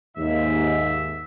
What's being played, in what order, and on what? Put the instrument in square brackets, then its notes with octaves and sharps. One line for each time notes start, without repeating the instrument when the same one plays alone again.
[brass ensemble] D#2 G#2 [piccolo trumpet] E5